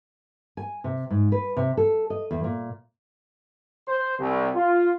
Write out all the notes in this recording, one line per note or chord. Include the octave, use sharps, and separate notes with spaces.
G#5
C3
G#2
B4
C3
A4
D#5
E2
A#2
C5
C2
F4